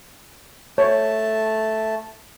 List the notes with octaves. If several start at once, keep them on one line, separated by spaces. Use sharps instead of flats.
A3 C#5 A5